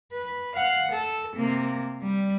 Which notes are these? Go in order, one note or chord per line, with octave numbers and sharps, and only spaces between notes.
B4
F5 F#5
A4
C3 A#3
G3